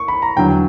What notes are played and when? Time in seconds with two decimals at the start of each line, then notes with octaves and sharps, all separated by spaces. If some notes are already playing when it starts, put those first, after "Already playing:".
Already playing: A#3 C#6
0.08 B5
0.22 A#5
0.36 E2 D3 F#3 G5